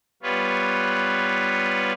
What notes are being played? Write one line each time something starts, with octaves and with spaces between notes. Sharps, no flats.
G3 B3 F4 B4 C#5